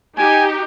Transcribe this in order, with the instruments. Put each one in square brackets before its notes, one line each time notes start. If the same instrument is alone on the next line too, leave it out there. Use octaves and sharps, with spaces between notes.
[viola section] D#4 G4 [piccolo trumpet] G#5